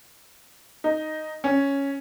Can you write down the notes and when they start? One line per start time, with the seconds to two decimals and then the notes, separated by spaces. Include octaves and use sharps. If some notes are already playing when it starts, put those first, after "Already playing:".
0.84 D#4
1.44 C#4